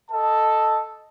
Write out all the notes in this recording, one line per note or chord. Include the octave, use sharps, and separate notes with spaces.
A4 D#5 A5